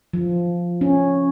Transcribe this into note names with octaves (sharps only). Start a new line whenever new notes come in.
F3
C#4